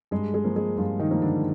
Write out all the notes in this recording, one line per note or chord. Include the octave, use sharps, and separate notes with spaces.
G2 G#3 G#4
G#3 G#4
F3 A#3
G#3 G#4
G2 F3 F4
D#3 D#4
F3 A#3
D3 D4